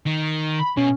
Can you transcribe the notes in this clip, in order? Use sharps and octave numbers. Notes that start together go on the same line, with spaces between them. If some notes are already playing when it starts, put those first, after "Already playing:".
D#3
B5
B2 C#4